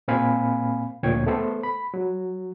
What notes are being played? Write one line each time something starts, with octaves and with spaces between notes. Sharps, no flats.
A#2 A#3 C4 F5 G#5 B5
D2 A#2 F3 C#5 G5 G#6
A3 B3 A4 C5
B5
F#3